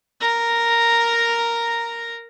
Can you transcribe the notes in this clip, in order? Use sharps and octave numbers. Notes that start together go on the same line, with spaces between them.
A#4 A#5